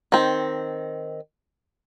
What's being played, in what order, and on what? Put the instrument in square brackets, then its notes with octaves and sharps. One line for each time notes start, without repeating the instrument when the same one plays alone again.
[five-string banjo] D#3 C4